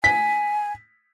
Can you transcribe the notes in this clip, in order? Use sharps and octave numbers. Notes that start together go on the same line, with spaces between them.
G#5 B6